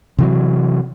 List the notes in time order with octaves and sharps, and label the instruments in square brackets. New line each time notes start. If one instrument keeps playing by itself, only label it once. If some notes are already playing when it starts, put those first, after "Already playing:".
[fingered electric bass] C3 E3 F#3